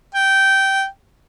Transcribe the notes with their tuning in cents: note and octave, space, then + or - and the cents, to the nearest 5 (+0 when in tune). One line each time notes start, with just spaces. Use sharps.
G5 -15